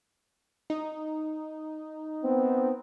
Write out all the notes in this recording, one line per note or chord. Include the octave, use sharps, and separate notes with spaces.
D#4
B3 C4